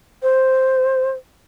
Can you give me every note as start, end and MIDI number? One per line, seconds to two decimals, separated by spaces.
0.22 1.11 72